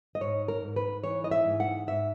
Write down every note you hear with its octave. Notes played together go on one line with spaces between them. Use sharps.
D#5
G#2 C#5
A#4
G#2
B4
E3 C#5
D#5
E5
G#2
F#5
G#2 E5